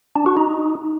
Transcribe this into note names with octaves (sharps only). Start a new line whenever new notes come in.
D4
F#4
D#4